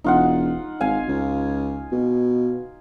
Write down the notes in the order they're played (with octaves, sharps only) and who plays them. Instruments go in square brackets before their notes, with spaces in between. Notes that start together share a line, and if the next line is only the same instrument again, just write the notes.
[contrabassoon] E1 [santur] D#4 F4 F#5
[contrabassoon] G#1 [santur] F5 G#5
[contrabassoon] C#2
B2